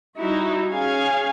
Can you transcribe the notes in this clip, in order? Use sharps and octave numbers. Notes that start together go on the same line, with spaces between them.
G3 D#4 E4 F#4
C#4 G#4 F5 G#5